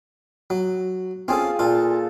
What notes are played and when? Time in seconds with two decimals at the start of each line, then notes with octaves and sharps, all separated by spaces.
0.50 F#3
1.28 C4 C#4 F4 G#4 A4
1.59 A#2 F4 A4